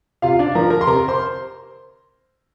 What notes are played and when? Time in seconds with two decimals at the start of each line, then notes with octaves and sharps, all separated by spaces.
0.22 C3 F4 F5
0.39 D4 D5
0.55 F3 A#4 A#5
0.70 A#4 A#5
0.81 C6
0.87 C3 A#4 A#5
1.08 C5 C6